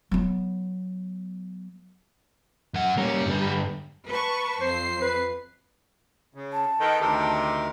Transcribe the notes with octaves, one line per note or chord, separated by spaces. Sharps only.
F#3 B3
F#2 F#5
G3 A#3 C#4
G2 D3 B4
B4 A5 C#6
F2 C5 C7
B4
C#3
A5
D#3 A4 B4 G5
D2 C3 D#3 G4 A#4